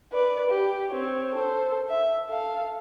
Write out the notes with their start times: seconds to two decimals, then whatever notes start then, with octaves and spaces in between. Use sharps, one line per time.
0.12 B4 D5
0.50 G4
0.90 C4 C#5
1.34 A4 C5
1.89 E5
2.29 A4 F5